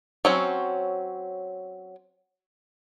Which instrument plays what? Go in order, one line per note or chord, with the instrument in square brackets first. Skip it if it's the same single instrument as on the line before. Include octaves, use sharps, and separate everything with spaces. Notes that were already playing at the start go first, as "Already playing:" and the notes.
[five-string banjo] F#3 C4 C#4